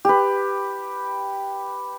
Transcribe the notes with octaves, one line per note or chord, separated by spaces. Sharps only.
G4 B4